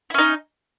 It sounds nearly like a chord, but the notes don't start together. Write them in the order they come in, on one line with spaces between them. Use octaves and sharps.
E4 C#4 D#4